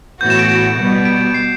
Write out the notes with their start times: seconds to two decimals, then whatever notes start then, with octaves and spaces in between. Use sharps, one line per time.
0.20 A2 E3 B3 F#4 G6
0.30 E7
0.39 D7
0.49 E7
0.78 B2 G3 B3
1.05 D7
1.34 C7